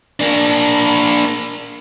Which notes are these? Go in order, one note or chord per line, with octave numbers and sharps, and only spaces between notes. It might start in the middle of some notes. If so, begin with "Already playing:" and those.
A#3 D4